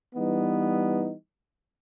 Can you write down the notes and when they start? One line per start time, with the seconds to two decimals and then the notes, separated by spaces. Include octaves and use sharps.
0.15 E3 G3 B3 D#4